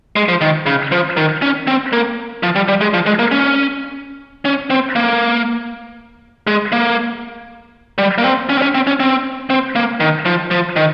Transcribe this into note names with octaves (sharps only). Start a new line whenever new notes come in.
G#3
F3
D#3
C#3
F3
D#3
C#4
C4
A#3
F3
G3
G3
G#3
F3
G#3
A#3
C#4
C#4
C4
A#3
G#3
A#3
G3
A#3
C4
C#4
C4
C#4
C4
C#4
C4
C4
A#3
D#3
F3
F3
D#3